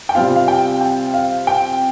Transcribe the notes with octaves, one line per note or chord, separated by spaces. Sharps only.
G5
C3 G3 C4 F4 F5
F5
G5
G5
F5
G5